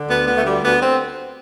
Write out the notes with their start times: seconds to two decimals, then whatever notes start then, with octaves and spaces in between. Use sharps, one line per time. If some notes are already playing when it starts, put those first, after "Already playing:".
Already playing: D3
0.09 D2 B3
0.26 D2 B3
0.38 A3
0.44 D3 G3
0.62 D2 B3
0.79 C4